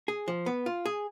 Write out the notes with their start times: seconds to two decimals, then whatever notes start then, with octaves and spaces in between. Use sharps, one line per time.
0.08 G#4
0.28 F3
0.46 B3
0.66 F4
0.85 G#4